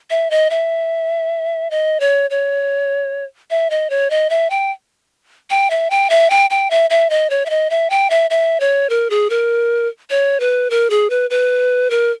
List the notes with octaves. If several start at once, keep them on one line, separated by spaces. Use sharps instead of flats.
E5
D#5
E5
D#5
C#5
C#5
E5
D#5
C#5
D#5
E5
G5
G5
E5
G5
E5
G5
G5
E5
E5
D#5
C#5
E5
D#5
E5
G5
E5
E5
C#5
A#4
G#4
A#4
C#5
B4
A#4
G#4
B4
B4
A#4